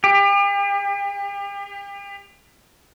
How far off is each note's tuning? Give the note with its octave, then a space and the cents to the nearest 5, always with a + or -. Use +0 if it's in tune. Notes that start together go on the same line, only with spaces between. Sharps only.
G4 +40